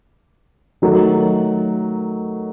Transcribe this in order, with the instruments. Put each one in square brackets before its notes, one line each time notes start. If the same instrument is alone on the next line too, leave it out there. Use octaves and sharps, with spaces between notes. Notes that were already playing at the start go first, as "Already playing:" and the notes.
[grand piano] D#3 F#3 A3